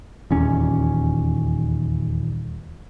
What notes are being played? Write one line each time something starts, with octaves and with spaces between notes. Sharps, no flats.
D#1 E2 C#4